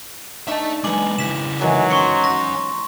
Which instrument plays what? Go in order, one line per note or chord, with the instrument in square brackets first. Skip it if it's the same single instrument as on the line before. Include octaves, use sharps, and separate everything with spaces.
[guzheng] D4 D#4 C#5 [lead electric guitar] E5 A5
[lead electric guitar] F#3 G#3 [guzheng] B3 G#4 [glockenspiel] D6 F#7
[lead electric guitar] C#3 E4 [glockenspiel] B6 E7
[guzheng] D#3 E3 G#3 [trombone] F#3
[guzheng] C4 [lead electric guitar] C#4 F#4 [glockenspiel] C6 C#6 C#7
[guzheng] C#5 [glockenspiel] A#6